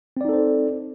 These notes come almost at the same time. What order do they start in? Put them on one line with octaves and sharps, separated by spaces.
C4 D5 D#4 A4 C5